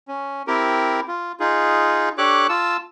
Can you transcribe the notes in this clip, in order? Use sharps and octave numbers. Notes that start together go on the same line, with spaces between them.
C#4
C4 E4 G4 A#4
F4
D#4 F4 G#4
D4 G4 A4 C#5 D6 F#6
F4 A5 E6